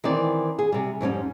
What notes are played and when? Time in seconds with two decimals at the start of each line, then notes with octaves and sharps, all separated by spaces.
0.04 D#3 E3 C4 D5
0.59 G#4
0.72 C3 G3
1.01 F2 G#2 G3 C#4